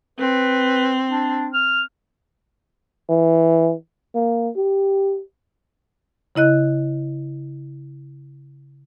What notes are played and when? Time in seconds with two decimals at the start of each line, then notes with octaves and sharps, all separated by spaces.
0.19 C4 B4
1.10 D4
1.54 F6
3.09 E3
4.15 A#3
4.56 G4
6.35 C#3 E4 D#5 F#6